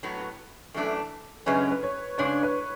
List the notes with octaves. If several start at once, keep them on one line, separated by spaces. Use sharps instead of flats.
A2 F#3 B3
F#2 E3 A3 D4 A4
F#2 C#3 G#3 C#4 B4
B4
C#5
C#3 G#3 D4 C#5
B4